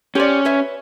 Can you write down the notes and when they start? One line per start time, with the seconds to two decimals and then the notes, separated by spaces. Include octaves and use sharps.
0.15 C#4 G4 C5 D5
0.45 B4 C#5 E5